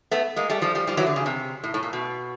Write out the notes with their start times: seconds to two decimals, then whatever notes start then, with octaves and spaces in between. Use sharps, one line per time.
0.11 A3 B3
0.36 G#3 A#3
0.50 G3 A3
0.62 F3 G3
0.75 F3 G3
0.87 F3 G3
0.97 E3 F#3
1.06 D3
1.16 C#3
1.26 C3
1.64 A2
1.74 A2
1.83 A#2
1.93 B2